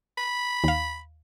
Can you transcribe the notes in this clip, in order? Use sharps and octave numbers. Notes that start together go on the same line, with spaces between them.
B5
D#2 F5